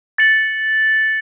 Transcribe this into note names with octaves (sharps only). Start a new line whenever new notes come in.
A6 C#7 F#7